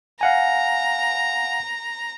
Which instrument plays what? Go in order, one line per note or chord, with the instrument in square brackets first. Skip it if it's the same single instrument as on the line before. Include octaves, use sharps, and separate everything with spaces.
[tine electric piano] F5 F#5 G#5 [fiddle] A#5